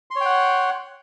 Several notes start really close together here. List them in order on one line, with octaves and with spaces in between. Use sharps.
C6 C#5 G5 F#5